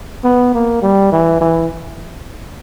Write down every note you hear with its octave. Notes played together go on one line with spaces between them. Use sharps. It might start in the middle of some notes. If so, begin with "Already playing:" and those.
B3
A#3
G3
E3
E3